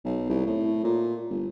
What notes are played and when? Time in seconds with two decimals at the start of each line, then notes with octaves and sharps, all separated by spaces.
0.04 B1
0.29 C2
0.46 A2
0.84 A#2
1.30 G1